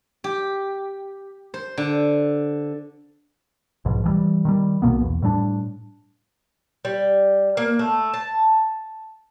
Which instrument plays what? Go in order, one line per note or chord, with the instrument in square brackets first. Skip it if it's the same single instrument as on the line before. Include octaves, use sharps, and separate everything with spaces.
[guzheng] G4
C5
D3
[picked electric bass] B1 G#2 B2 F3
E3 F3 G3
D#3 F#3 G3
B1 B2 A#3 B3
E2
A2 G3 G#3 D4
[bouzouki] G3
A#3
A3
A5